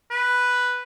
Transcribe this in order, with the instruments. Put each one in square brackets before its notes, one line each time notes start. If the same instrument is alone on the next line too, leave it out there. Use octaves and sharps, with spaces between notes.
[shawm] B4